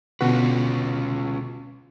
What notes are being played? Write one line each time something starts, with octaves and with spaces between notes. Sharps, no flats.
B2 D3 C#4 F4 F#4 B4